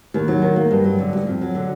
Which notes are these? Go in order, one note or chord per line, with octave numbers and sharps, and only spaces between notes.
D#2
F#3
D#3
A#3
G2
F#3
D3
G2
F2
F#3
D3